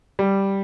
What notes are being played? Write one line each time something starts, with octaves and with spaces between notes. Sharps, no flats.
G3